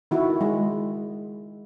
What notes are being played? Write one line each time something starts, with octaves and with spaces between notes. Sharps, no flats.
D#3 E4 F#4
G#3